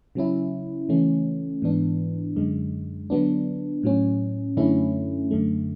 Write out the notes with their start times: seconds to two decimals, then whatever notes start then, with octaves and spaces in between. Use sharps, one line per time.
0.15 C#3 F#3 C#4 E4
0.89 C#3 E3 A3 C#4
1.62 G#2 E3 B3 D4
2.36 F#2 D3 G#3
3.10 D3 F#3 B3 D4
3.83 A2 F#3 C#4
4.57 F#2 D3 A3 C#4 E4
5.31 F#2 D3 A3